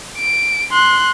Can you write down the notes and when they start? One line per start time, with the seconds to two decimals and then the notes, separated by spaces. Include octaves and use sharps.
0.18 D7
0.72 C6 F#6